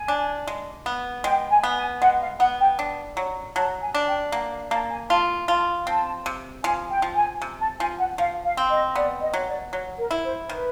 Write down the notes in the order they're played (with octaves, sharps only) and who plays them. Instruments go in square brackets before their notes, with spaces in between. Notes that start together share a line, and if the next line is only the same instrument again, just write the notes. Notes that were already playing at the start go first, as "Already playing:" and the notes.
Already playing: [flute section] G#5
[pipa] D4
G#3
B3
[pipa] G#3 [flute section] G5
[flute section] G#5
[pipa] B3
[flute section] G#5
[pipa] G#3 [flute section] F#5
[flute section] F5
[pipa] B3 [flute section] F#5
[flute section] G5
[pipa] D4
F#3
[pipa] F#3 [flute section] A5
[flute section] G#5
[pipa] D4
[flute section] G5
[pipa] A#3 [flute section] F#5
[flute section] F5
[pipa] A#3 [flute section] A5
[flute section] G#5
[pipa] F4 [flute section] A5
[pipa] F4 [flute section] A5
[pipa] C4 [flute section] A5
[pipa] C3
[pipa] F3 [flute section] G#5
[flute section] G5
[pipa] F3
[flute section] G#5
[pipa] C3
[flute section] A5
[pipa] F3 [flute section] G#5
[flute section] F#5
[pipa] F3 [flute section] F5
[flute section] F5
[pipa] C4
[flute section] D#5
[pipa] B3 [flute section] D5
[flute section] D#5
[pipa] F#3
[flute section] D5
[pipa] F#3 [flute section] C#5
[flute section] A#4
[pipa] E4
[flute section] C5
[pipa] D#3 [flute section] B4